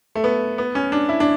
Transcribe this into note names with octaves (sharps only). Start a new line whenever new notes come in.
A3
B3
B3
C#4
D4
E4
D4